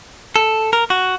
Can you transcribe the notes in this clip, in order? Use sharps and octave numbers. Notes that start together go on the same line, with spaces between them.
A4
A#4
F#4